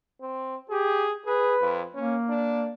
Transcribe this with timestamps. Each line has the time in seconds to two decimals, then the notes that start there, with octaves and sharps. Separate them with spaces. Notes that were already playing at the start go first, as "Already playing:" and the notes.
0.21 C4
0.70 G4 G#4
1.26 G#4 B4
1.61 F2
1.94 A#3 C#4
2.29 D4